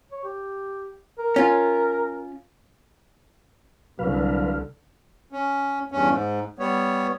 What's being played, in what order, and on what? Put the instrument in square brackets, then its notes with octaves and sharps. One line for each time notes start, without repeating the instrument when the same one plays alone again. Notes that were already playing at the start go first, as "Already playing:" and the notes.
[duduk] C#5
G4
A#4
[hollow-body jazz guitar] C#4 F4
[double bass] C2 D3 [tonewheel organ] F#3 B4 F5
[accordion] C#4
E2 G2 C#4
G#2
G3 B3 C#5